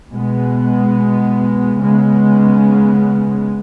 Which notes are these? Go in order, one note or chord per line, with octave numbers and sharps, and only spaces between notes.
B2 G#3 B3
C#3 G#3 B3